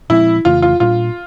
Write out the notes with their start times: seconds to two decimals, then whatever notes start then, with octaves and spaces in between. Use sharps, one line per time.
0.10 A#2 F3 G#3 C4 E4
0.45 F2 C#3 E3 A3 F4
0.62 F4
0.80 A#2 G3 A#3 D4 F4